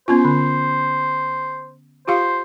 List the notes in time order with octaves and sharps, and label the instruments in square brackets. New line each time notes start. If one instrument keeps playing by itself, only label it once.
[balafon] B3 C#4 F4 [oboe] C5
[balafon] D3
[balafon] F4 G4 F5 [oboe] C5